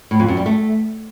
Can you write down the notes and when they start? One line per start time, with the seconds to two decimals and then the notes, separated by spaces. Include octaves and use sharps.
0.11 A2
0.20 F2
0.28 F#2
0.37 G3
0.46 A3